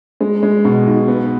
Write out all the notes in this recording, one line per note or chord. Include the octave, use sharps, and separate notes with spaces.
G#3
G#3
B2
B1
B3